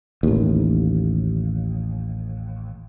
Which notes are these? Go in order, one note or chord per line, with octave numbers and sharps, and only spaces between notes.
A1 D#2